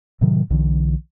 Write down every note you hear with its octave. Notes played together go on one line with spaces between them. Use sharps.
A2 C3 D#3 F#3
B1 D3 E3